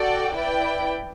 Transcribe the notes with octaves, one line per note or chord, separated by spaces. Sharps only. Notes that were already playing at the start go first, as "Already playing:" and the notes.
Already playing: F#4 A4 D5 G5
E4 B4 D5 G5